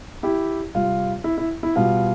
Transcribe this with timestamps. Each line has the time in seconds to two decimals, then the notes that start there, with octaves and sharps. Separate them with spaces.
0.23 E4 G4
0.75 C3 G3 F4
1.24 E4
1.37 E4
1.63 E4
1.76 B2 G3 F4